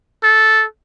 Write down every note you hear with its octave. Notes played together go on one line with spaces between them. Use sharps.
A4